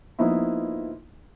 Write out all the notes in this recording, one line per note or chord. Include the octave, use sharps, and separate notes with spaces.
F3 A#3 B3 D#4 E4